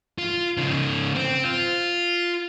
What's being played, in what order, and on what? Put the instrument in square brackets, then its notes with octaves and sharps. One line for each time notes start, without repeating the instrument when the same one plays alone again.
[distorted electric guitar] F4
C#3 D#4
C4
F4